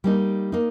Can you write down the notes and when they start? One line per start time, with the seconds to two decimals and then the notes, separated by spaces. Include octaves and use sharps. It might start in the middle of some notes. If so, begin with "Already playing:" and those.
0.04 G3 A#3 D#4
0.52 A#3 D#4